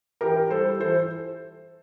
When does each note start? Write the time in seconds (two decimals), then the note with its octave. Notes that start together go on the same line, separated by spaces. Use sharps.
0.21 E3 G4 A#4
0.50 G3 A4 C5
0.79 E3 A4 C5